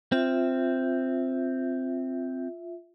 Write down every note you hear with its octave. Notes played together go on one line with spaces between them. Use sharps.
C4 F4 E5